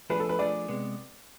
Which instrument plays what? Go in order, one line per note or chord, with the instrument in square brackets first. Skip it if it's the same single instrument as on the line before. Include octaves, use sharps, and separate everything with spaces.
[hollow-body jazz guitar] F3 A3 D4 G#4 [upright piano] B4
[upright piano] A4
B4
[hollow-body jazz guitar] F3 A3 D4 G#4 [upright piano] D5
[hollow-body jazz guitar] C3 G#3 B3